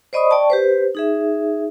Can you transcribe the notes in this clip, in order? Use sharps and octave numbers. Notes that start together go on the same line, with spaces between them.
C5 D5 D#5 B5 C#6 D#6
D5 G5 A5 C#6
G4 B4 C5
D#4 G#4 E5